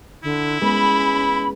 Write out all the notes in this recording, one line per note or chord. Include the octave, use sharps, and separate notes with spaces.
D3 E4
G#3 B3 C#4 B5